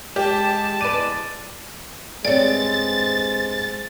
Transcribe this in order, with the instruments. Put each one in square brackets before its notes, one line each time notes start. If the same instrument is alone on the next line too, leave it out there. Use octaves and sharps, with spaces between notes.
[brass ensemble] G#3 [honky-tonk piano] G4 [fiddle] A5
[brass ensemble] E2 G#3 [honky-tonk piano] B4 D#7 [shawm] D5
[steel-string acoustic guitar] G2 C4 [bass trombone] G#3 [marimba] C#5 D5 [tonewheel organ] A6